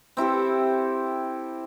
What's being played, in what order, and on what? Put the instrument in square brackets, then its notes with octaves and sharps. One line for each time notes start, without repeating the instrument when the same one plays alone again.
[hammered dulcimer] C4 E4 G4 A4